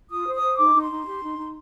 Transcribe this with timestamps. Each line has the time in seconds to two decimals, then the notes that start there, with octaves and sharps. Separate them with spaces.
0.10 F4 D#6
0.26 C5
0.33 D#6
0.42 C5
0.57 D#4 D6
0.74 D#4
0.81 C6
0.90 D#4
1.05 G4
1.22 D#4
1.37 D#4